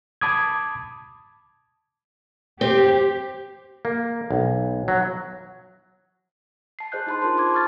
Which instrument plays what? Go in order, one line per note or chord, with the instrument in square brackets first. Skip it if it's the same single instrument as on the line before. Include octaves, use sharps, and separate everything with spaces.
[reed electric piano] A5 B5 D6 D#6 G#6
[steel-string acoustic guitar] C4 [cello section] G4
[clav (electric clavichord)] A#3
B1
F#3
[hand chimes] A5 C7
G#4 C5 D#5 F#6 G6
D#4 E4 A5 B5 C6
D4 F4 G#4 A#4 C5 C6
A5 D6 G#6
C#6 D6 F6 A6